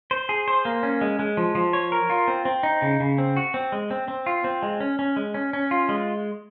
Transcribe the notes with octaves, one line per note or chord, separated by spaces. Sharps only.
C5
G#4
C5
A#3
C#4
G#3
G#3
F3
F3
C#5
A#4
F4
C4
C4
D#4
C#3
C#3
C4
F#4
C4
G#3
C4
C4
F4
C4
G#3
C#4
C#4
G#3
C#4
C#4
F4
G#3